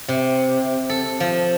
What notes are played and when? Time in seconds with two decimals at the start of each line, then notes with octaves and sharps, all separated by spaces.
0.08 C3
0.89 A4
1.20 F3